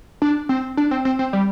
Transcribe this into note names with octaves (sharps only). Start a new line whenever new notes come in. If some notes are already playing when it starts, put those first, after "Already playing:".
D4
C4
D4
C4
C4
C4
G3